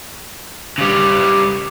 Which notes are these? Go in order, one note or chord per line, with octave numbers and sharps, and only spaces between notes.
C#3 G3